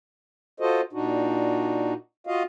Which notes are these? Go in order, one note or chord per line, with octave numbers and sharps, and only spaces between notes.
F4 F#4 A4 C5 D#5
A#2 D4 D#4 F#4
F4 F#4 D#5 F5